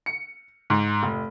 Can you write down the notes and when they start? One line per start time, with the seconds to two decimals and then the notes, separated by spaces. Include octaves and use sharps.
0.06 C#7
0.70 G#2
1.03 F1